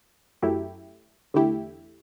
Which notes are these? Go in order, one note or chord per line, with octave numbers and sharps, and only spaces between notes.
F#2 F#3 A3 E4 G4
E2 D3 A3 E4 G4